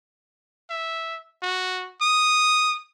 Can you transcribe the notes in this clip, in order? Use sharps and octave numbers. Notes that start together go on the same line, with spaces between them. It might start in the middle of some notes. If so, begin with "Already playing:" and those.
E5
F#4
D#6